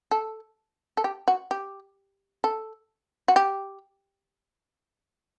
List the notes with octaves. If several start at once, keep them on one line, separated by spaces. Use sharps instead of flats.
A4
A4
G4
F#4
G4
A4
F#4
G4